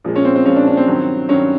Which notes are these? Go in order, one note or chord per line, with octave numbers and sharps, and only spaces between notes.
A#2 F3 G#3
C#4
C4
C4
A#2 F3 G#3 C#4
D4
D4
C4
G2 D#3 F#3
G2 D#3 F#3 C#4